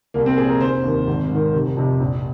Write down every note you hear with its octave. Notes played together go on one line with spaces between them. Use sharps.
C2 A#3
C4
A#2 F3 G#4
A#4
F1 C5
D#2 D#3
G#1
G#2
D#3
F1
F2 C3
A#1